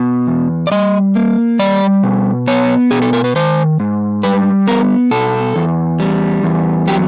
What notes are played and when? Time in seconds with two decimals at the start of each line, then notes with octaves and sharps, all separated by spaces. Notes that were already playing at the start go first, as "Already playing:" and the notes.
Already playing: B2
0.27 E2
0.67 D5
0.71 G3 D#5
1.15 A#3
1.59 G3 D5
2.03 B2
2.47 B3 C#5
2.91 B2 G#4
3.02 A4
3.13 A#4
3.24 B4
3.36 D#3 C5
3.80 G#2
4.23 G3 B4
4.67 B3 A#4
5.11 B2 A4
5.56 E2
6.00 G3
6.43 E2
6.87 F#3 G4